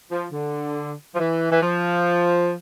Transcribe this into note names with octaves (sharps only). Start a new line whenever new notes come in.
F3
D3
F3
E3
E3
F3